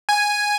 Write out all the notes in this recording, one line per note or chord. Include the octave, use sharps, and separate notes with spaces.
G#5